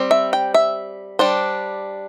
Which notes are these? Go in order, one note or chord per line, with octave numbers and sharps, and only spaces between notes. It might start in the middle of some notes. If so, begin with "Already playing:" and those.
Already playing: G3 C4
E5
G5
E5
G3 D4 C5